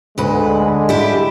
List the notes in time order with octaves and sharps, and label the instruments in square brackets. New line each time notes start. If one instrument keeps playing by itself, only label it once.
[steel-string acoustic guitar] D2 B4 [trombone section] D3 G#3
[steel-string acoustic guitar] E4 G4